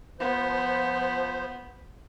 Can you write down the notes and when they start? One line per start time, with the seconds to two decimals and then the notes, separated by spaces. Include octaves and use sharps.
0.20 F3 B3 C5